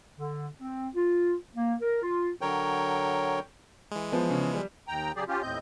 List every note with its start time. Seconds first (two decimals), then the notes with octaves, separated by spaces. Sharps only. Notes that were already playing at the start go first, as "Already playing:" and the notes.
0.18 D3
0.60 C4
0.95 F4
1.55 A#3
1.81 A#4
2.03 F4
2.41 D3 F#3 A#4 C#5 G5
3.91 E3 G#3
4.12 F3 B3
4.30 C#3
4.54 G3
4.88 D#2 G5 A#5
5.16 C#3 F#3 G4 G#4 D5
5.28 C#4 F4 G4
5.42 D#2 A2 C4 D#5 G6